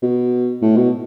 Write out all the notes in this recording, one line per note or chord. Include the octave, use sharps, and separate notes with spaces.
B2
A2
B2